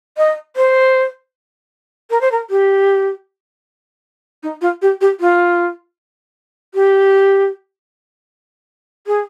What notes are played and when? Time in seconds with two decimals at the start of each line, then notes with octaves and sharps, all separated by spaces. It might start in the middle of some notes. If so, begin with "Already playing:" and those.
0.17 D#5
0.56 C5
2.10 A#4
2.21 C5
2.32 A#4
2.50 G4
4.43 D#4
4.61 F4
4.82 G4
5.01 G4
5.20 F4
6.74 G4
9.07 G#4